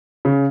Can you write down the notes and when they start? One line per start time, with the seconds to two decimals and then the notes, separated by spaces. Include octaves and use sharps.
0.25 C#3